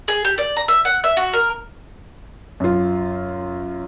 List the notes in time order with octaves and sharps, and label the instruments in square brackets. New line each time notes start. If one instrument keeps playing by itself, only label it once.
[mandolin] G#4
G4
D5
A#5
E5
F#5
E5
F#4
A#4
[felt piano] F#2 F4